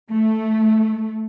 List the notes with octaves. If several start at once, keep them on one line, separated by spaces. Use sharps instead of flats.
A3